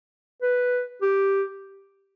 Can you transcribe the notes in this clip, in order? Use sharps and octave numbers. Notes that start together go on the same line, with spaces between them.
B4
G4